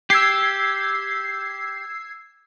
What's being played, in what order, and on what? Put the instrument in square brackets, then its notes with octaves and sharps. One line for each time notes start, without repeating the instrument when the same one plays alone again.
[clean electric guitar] G4 [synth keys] E6 G#6 C7